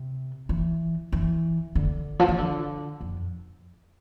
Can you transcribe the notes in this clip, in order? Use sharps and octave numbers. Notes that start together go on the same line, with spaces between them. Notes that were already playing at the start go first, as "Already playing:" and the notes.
Already playing: C3
E3
E3
D3
F3
E3
D3
F2